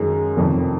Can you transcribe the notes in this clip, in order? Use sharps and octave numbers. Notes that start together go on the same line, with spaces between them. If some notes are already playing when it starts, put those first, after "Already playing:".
Already playing: F#2 D#3 G#3
F1 F2 D#3